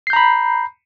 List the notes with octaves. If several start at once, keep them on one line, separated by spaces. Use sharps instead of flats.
A#5 B5 G6 C7